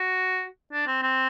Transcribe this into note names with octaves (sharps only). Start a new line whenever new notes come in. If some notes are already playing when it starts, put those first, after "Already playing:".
Already playing: F#4
D4
C4
C4